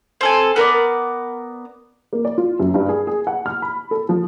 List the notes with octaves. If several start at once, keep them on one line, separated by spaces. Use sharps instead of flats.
C4 A4 G#5
B3 A#4 B4 D5
A#3
D5
F4
F#2
G2
G#4
G#4
F#5
F6
B5
A4
F3